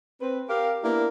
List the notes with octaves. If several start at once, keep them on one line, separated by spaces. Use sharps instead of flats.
C4 B4
G4 A#4 F5
A#3 B3 D4 E4 G4 A#4